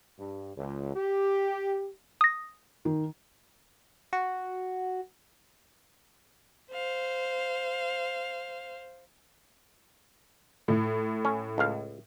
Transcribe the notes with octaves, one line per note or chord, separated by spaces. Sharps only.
G2
C#2
G4
D#6 A#6
D#3
F#4
C5 F5
A2
C#4
C#2 F5